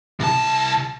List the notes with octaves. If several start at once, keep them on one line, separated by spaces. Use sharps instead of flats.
C2 A5